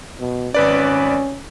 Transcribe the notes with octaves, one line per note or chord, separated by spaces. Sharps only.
B2
G#1 C#4 B4 D5